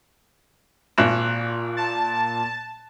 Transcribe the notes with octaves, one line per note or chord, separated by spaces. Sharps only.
G#1 A#2 F#6 E7
A5